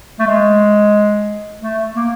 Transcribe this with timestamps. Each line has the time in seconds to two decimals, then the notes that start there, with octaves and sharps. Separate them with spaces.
0.19 A3
0.27 G#3
1.61 A3
1.96 A#3